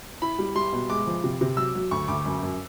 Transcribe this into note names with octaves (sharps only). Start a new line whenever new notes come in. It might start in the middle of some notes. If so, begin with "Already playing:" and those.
E4 B5
G3
G3 C6
B2
G#3 D6
F3
C3
C3
F#3 E6
F#3
D2 C#6
D2 D6
F#2
F#2